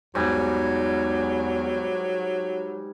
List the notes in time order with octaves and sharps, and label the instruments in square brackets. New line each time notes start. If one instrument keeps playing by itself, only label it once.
[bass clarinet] E2 [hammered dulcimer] G#2 G3 [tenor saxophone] F#3